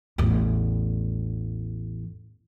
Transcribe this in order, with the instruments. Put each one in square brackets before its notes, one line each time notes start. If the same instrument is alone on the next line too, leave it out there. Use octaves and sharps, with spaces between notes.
[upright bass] A1 E2